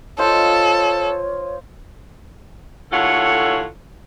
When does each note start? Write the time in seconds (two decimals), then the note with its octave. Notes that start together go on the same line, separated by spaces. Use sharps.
0.19 F4 A4 C5 C#5 D#5
2.91 D#2 A2 F4 A4 C#5 F#5